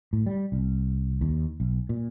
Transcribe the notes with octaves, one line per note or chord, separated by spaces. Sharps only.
A2
G3
C2
D#2
B1
A#2